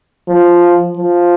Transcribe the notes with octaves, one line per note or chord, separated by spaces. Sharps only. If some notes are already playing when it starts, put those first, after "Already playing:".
F3
F3